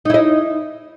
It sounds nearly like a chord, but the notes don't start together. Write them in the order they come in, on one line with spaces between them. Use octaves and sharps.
D#4 E4 D#5